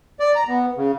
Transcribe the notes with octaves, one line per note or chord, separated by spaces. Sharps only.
D5
A#5
B3
C#3